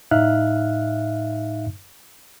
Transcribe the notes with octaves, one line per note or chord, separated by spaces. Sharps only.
A2 D#4 E5 F5 F6 F#6